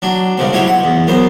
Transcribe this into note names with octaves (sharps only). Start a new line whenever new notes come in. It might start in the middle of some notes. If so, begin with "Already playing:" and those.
F#3 D4
G2 C#3 G#3 C4
F#3 C4 E4 G4 C#5
F#5
E2
F#2 B3 C5